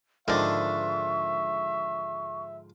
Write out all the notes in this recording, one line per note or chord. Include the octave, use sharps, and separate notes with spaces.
G#2 D3 D#3 F3 D4 E5 C#6